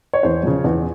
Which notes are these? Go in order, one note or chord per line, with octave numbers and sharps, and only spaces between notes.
C#5
E2 C5
C#3 F3
E2